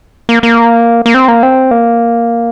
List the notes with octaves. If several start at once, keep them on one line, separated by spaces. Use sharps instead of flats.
A#3
A#3
A#3
C4
A#3
C4
A#3